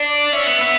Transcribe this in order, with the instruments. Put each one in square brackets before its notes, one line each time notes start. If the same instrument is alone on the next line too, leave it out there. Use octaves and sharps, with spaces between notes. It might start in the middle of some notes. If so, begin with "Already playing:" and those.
Already playing: [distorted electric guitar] D4 [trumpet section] D5
[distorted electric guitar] C#4 [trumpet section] E5
[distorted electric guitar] B3
B3